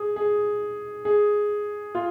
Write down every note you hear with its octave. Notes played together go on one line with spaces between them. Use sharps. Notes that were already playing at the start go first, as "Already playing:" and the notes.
Already playing: G#4
G#4
G#4
F4